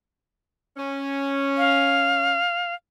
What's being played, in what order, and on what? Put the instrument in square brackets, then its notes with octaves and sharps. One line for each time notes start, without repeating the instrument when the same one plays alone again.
[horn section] C#4
[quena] F5